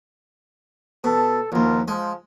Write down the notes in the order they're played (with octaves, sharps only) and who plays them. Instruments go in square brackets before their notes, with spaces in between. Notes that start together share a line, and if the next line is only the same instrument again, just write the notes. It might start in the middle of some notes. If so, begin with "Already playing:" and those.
[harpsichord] B2 [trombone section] A4
[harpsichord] A#1 D#2 [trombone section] B2 F4 A#4
[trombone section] F3 [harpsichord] G#3